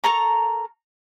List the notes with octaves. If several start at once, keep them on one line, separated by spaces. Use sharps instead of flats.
A4 A#4 A#5 C#6